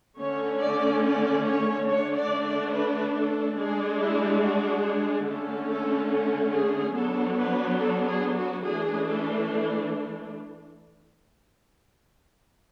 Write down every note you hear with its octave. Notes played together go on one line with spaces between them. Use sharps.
D3 A3 C#4 C#5
D5
D5
C#5
D3 A3 D4 C#5
D5
D5
B4
A4
G#3 D4 G#4
E4
F#4
G#4
D3 A3 C#4 A4
A4
A4
G#4
F#3 B3 D4 A4
B4
A4
G#4
F#4
E3 A3 D4 G#4
A4